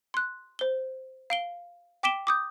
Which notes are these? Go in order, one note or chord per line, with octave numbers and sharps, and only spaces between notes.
C6 F#6
C5 G7
F5 D7 G7
G5 D6 B6 D7 E7 G7
D6 D#6 G6